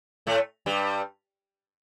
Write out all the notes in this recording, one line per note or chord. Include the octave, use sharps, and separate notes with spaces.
A2 A3
G2 G3